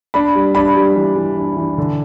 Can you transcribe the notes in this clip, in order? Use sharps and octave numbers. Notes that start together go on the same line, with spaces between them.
D4 B5
G3
D4 B5
G3
E3
E3
D4
E3
D3